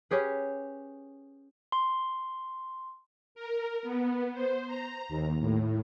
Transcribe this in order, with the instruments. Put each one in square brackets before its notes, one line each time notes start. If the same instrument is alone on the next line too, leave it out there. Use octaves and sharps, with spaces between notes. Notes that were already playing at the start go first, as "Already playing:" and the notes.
[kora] C#4 G4 G#4 B4
[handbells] C6
[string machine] A#4
B3
C5
A#5
D#2
A2